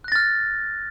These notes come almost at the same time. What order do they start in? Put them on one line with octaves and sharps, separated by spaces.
F#6 A#6 A6 F6